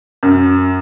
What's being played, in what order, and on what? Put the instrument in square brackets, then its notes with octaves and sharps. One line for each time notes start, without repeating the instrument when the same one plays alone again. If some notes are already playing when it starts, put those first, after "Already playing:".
[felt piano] F#2